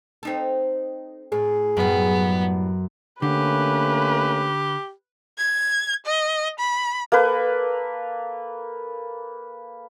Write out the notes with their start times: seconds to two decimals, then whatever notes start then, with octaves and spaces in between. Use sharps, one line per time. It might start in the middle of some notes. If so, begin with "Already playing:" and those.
0.23 C4 D#4 A4
1.32 A2 G#4
1.77 F#2 A2 G3 B3
3.22 D3 A3 A#3 C#4 G4 B4
5.38 G#6
6.06 D#5
6.59 B5
7.12 A#3 A4 B4